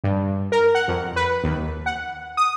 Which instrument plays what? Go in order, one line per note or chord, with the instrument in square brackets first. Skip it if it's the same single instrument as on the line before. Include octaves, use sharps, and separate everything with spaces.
[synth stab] G2
A#4
F#5
F2
B4
D#2
F#5
D#6